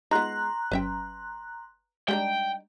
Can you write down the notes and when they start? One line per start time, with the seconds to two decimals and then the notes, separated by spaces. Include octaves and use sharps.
0.11 G#3 B3 D#4 F4 A#5 C6 F#6
0.72 G1 F#3 C#4 B4 E5 G5
2.08 G3 G#3 D4 D#4 G5